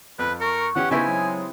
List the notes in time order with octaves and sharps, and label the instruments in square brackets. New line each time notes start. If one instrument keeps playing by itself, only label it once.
[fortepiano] F2 [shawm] B4
[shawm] A#4 [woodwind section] C#6
[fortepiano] E3 C#4 G4 [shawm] F#5
[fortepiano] C#3 B3 D#4 [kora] C4 E4 G4 [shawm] G#5
[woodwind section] F#3 G#3